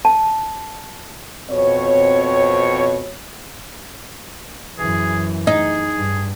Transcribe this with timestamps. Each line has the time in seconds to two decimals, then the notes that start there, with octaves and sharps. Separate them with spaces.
0.05 A5
1.51 F2 B2 C4 C#5
4.79 F#2 E3 G#4
5.47 D#4 G#4
5.96 G2